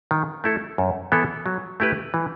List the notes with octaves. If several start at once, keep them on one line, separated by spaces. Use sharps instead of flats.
D#3
A3 E4 A4
F#2
E3 B3 E4 A4
F#3
A3 E4 G4 B4
E3